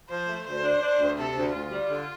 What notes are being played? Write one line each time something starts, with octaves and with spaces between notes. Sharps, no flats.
F3 C5
A3
D2 C5
D4
D4
D2
C3 A4
D2
D2 F4
G3
D3